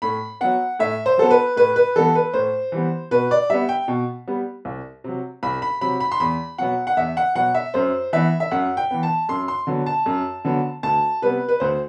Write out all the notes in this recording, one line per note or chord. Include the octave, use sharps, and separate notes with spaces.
A2 B5
F#3 B3 F#5
A2 E5
C5
F#3 B3 A4
B4
A2 B4
B4
E3 G3 B3 A4
B4
A2 C5
E3 G3 B3
B2 B4
D5
G3 B3 E5
G5
B2
G3 B3
C2
C3 F#3
C2 B5
B5
C3 F#3 B5
B5
C6
E2 B5
B2 F#3 B3 F#5
F#5
E2 E5
F#5
B2 F#3 B3 F#5
E5
F#2 C5
E3 B3 E5
E5
F#2 F#5
G5
E3 B3
A5
F#2 C6
C6
D3 F#3 B3
A5
F#2
D3 F#3 B3
D2 A5
C3 G3 B3 B4
B4
D2 C5